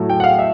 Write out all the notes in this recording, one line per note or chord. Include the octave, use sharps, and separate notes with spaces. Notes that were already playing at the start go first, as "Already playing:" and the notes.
Already playing: A2 F#3 A3
G5
F#5
F5
E5